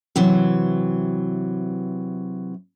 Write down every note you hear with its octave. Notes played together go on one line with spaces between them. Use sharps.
C3 E3 F#3